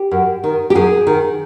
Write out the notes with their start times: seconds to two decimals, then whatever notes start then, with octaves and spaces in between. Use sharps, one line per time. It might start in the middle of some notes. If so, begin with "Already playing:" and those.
Already playing: G4
0.11 F#2
0.44 D#3
0.70 G4
0.75 F#2 G#4
1.07 D#3